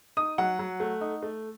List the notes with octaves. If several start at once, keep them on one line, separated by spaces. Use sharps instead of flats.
D#4 D#6
F#3 F#5
F#3
A3
D#4
A3